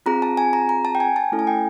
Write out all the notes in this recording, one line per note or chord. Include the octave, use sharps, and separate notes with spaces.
C4 F4 G#4 A#5
A5
G#5
A#5
A#5
A5
G5
G#5
A5
A3 C#4 E4 A4
G#5
G5